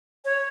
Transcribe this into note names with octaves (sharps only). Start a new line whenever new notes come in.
C#5